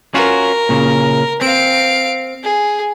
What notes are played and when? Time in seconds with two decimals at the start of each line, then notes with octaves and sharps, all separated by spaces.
0.14 C#4 F4 F#4 A#4
0.69 A#2 C#3
1.41 C4 F5 D7
2.43 G#4